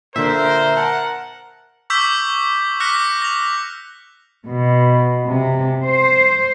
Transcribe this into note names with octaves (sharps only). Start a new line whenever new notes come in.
A#2 D3 A#4 C5 E5
F#5 A5
C#6 D6 E6 G6 B6 F#7
D6 F6 F#6 A#6 B6 C#7
A#6 F7
B2
C3
C5